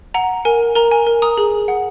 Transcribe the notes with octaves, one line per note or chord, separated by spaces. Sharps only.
F#5 A#5
A#4 G#5
A#4 A#5
G#5
A#4
A#5 D#6
G#4
F#5